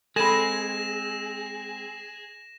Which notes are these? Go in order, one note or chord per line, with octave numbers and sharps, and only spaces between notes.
G#3 C4 G#4 A4 B5 A#6 D#7 E7